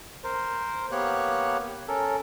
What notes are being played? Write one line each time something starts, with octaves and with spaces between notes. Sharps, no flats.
A#4 C5
A#3 B3 G4 C#5 F#6
C#4 A4 A#4